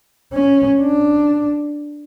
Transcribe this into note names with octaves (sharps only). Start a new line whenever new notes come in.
C#4
D4